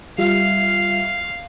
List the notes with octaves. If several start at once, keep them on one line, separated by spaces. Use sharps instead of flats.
G3 F4 E5 F5